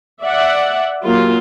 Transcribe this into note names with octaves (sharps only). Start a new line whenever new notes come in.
D5 E5 F#5
F#3 A#3 F4 G4